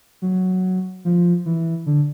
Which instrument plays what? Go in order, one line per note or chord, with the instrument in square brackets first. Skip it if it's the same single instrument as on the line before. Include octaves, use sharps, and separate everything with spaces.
[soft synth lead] F#3
F3
E3
D3